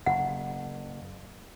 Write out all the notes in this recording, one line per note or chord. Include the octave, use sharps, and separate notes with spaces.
F#1 F#5